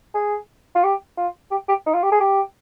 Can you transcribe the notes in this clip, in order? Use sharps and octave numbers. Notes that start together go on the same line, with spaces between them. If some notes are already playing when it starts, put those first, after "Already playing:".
G#4
F4
G4
F4
G4
G4
D#4
F4
G4
G#4
G4